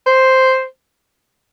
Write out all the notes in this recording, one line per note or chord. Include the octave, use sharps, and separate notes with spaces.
C5